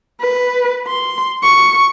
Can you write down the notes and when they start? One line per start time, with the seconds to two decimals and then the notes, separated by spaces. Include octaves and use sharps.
0.21 B4
0.88 C6
1.43 C#6